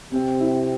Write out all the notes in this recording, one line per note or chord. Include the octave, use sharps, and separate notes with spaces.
C3 C4
E4